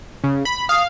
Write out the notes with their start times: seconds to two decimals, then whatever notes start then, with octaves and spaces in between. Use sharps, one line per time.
0.24 C#3
0.45 B5
0.69 F5 D#6